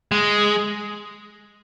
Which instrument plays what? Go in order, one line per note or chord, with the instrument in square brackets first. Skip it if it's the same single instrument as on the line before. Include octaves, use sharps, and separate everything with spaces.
[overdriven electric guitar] G#3